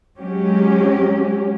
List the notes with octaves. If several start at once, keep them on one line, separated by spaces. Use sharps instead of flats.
F#3 G#3 C#4 F#4 G4